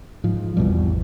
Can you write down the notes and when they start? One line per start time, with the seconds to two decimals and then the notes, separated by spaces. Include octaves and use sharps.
0.24 G#2 F3
0.57 G#1 E2 B2 G3